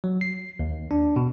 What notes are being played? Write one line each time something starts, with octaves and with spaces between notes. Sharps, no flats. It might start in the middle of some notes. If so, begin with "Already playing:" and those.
F#3
C7
D#2
D4
B2